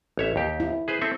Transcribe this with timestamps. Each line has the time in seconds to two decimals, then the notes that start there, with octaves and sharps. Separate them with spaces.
0.17 A1 C#5 E5
0.36 D#2 G4
0.60 E4
0.88 G#4 B4 C5
1.01 C4 A4 E5